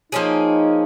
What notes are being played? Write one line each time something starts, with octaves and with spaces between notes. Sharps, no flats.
F3 A#3 C#4 D#4 G#4